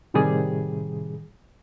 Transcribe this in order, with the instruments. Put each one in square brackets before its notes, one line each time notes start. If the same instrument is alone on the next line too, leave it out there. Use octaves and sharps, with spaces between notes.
[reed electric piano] A2 C3 D#3 G3 G#4